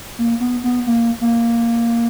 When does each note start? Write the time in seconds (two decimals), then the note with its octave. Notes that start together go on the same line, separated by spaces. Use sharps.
0.19 A#3
0.40 B3
0.64 B3
0.87 A#3
1.21 A#3